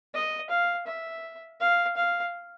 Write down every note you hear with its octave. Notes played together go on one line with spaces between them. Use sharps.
D#5
F5
E5
F5
F5